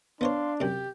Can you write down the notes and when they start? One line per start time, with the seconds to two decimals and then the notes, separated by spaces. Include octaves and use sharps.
0.21 B3 D4 C5 C#5 F5 C6
0.60 F#2 C3 G4